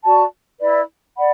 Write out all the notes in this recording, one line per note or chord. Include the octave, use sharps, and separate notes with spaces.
F#4 D5 A5
E4 B4 D5
D5 F#5 B5